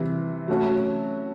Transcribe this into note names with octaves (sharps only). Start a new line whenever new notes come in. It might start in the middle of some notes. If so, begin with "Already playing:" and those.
Already playing: C3 E3 G3
F#3 A3 C#4 F#4